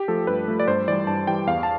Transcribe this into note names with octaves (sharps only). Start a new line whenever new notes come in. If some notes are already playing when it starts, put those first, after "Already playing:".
Already playing: G4
F3 A3 A4
G2 B4
F3 A3
D5
G2 C5
E3 G3 D5
G2 A5
E3 G3 G5
E2 F5
A5